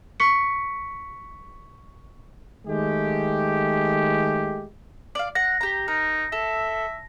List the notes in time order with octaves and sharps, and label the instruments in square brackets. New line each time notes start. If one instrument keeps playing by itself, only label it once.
[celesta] C#6 B6 C#7
[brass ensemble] D#3 G#3 A3 G4
[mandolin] D5 F5
[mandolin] F#5 [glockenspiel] A#6
[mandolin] G4 A#5
[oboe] D#4 [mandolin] A#4
[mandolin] A4 [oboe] E5